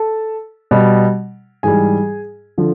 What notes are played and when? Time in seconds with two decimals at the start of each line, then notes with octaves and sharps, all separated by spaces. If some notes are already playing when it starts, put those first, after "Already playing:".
Already playing: A4 A5
0.71 B2 G3
1.63 G#2 E3 G3 G#4 G#5
2.58 D3 F3